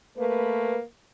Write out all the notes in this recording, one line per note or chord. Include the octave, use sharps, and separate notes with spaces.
A3 A#3 B4